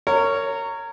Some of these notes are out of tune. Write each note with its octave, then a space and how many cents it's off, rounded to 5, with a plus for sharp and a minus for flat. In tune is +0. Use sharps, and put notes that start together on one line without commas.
A#4 -20 C#5 +5